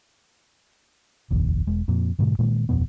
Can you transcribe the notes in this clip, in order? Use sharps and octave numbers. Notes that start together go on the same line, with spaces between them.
F1 A#1 D#2
E1 G#3
F2 A#2
G#2 B2 D3 G#3
A#2 D#3 G#3 A#3
D1 F2 B2 B3